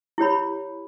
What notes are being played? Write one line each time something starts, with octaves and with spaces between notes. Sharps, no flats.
E4 G4 C#5 B5